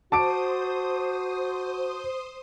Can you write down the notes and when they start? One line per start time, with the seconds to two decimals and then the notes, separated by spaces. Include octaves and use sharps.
0.12 F#4 C5 A5 D6 D#6 D7